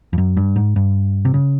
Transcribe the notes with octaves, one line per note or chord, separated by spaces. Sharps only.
F2
F#2
G2
G#2
G2
C3
C#3